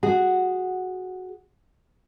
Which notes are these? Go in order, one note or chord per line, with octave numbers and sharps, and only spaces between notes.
F#4 G#4